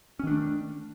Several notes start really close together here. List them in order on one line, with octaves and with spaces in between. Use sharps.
C#4 D#3 D4 A3